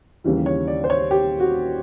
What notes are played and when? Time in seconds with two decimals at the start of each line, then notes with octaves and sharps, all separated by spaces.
0.24 D#2 C#3 E3 G3
0.46 C#5
0.68 D5
0.84 C5
0.90 C#5
1.11 G4
1.40 F#4